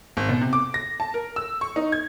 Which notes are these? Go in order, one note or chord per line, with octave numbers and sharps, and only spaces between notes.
G#1
B2
C3
D6
A#6
A5
A#4
E6
C#6
D#4
G#6